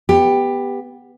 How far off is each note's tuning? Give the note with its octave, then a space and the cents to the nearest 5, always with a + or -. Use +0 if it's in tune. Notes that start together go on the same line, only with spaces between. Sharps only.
B3 +0 G4 +15